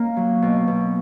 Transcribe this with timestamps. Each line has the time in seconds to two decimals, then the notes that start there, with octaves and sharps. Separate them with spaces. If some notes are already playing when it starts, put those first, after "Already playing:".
Already playing: A#3 C#4
0.16 F#3
0.42 B2
0.67 B2